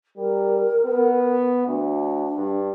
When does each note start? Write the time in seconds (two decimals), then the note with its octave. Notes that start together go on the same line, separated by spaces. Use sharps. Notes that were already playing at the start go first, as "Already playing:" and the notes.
0.17 G3 A#4
0.86 B3
1.67 D2 D4
2.37 G2